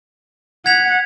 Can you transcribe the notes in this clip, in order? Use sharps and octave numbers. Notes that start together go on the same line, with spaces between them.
F#5 G#6 B6 F7